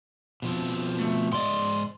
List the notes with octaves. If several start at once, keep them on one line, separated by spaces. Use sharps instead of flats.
B2 F3 C4
A3
G#2 D5 D#5 C6